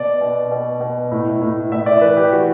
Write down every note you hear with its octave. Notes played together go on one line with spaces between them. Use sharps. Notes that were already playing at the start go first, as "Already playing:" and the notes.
Already playing: B2 D5
B2
B2
B2
A2
A2
A2 E5
D5
E3 B4
G4
E3 F#4